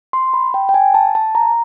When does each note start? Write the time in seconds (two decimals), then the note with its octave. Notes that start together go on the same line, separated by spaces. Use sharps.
0.13 C6
0.34 B5
0.54 G5
0.69 G5
0.74 G#5
0.94 A5
1.15 A5
1.35 A#5